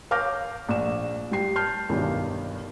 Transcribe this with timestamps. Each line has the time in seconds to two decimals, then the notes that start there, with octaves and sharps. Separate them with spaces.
0.11 C#5 F5 D6 F6 G6 A#6
0.69 A#1 E7
1.31 G3 G5 C7
1.56 A5 F6 G6 C7
1.89 B1 E2 G2 D#3